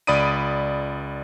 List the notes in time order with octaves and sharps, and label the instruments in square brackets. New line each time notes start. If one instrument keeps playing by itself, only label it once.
[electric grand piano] C#2 D5 B5 D#6 D7 D#7